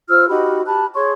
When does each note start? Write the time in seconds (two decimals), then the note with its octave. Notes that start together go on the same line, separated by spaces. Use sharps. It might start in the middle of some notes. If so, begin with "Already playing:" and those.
0.09 F4 C5 E6 F6
0.29 D#4 F#4 G4 B5
0.66 G4 A5 B5 F#6
0.95 G#4 C#5 C6 C#6